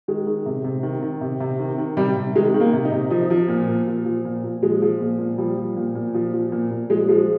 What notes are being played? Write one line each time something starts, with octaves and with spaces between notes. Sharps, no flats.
D#3 G#3
D#3
C3
C3
D#3
D#3
C3
C3
D#3
D#3
C3 G3
C3
D#3 G#3
D#3
A#3
C3
D#4
C3
F3 D#4
F3
A#2
A#2
F3
F3
A#2
A#2
F3 G#3
F3
A#2
A#2
F3 G3
F3
A#2
A#2
F3
F3
A#2
A#2
F3 G#3
F3 G#3